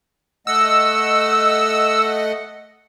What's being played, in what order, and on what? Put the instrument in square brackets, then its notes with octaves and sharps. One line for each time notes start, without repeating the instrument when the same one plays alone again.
[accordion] A3 D#5 F#5 [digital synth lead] E6